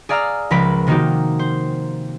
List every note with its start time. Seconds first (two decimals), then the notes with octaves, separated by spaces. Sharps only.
0.09 G#4 D5 F5 A#5 E6 F6
0.50 C#2 F3 A#4 B4 B5 D7
0.87 C3 D#3 A#3 D#4 F#4 G4
1.39 C5